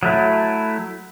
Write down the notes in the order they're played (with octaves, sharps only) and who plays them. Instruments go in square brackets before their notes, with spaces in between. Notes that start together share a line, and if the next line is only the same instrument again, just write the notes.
[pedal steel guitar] F#3 A3 E4